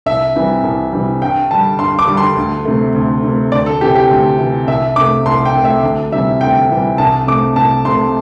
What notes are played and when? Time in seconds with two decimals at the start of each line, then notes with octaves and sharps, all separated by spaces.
0.06 C2 E5
0.35 C3 E3 G3
0.64 C2
0.92 C3 E3 G3
1.22 G2 G5
1.51 D3 G3 A5
1.79 G2 C6
1.99 D6
2.07 D3 G3
2.17 C6
2.37 D2
2.65 C3 A3
2.95 D2
3.24 C3 A3
3.52 D2 D5
3.66 A4
3.81 C3 E3 G4
3.95 G4
4.11 D2
4.39 C3 E3
4.67 C2 E5
4.96 C3 A3 D6
5.26 C2 C6
5.45 G5
5.54 C3 A3
5.65 E5
5.83 D2
6.12 C3 E3 G3 E5
6.41 D2 G5
6.70 C3 E3 G3
6.98 C2 A5
7.27 C3 A3 D6
7.56 C2 A5
7.85 C3 A3 C6